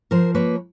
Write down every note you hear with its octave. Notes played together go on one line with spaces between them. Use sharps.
F3 A#4 C5
A#3 B4 C#5